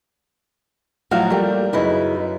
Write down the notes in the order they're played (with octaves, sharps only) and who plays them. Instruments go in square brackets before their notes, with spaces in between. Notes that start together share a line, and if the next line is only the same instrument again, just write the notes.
[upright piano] A2 F3 F#3 [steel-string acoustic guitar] F#4 E5 F5
[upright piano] G3 A#3 F4 [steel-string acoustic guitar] A3 G4
[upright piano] F#2 B4 [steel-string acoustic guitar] C#3 D#4 E4